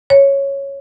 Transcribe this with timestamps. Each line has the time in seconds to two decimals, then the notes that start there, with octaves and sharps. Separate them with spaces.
0.10 C#5